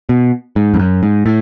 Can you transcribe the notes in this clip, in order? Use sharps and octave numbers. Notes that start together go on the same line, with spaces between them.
B2
G#2
F2
F#2
G#2
A2